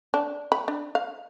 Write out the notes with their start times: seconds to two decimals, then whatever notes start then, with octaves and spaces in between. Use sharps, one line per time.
0.14 D4
0.52 B5
0.68 D4
0.95 F5